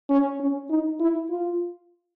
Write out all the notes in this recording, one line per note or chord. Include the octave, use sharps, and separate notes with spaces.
C#4
C#4
D#4
E4
F4